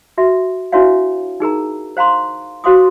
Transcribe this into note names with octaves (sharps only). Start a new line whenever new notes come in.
F#4 E5
D4 E4 F#4 C#5 E5 F5
D#4 G#4 A#4 A#5
C5 F5 A#5 C6
F#4 C5 F5 C6 D6 D#6